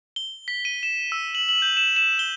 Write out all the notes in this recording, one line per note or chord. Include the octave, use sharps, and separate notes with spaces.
G7
B6
D#7
E7
E6
F#7
F#7
G6
E7
E7
G7